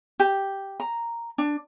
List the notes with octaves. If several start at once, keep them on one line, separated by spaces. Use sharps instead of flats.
G4
A#5
D4